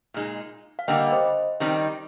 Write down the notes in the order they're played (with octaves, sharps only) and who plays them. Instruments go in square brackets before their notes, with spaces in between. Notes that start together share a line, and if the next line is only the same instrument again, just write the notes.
[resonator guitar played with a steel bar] A#2 G#3 D#4
[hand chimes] F5
[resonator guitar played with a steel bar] D3 G3 A#3 [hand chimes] D#5 G5
[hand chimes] C5 D#5
[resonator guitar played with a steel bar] D#3 G3 C4 D#4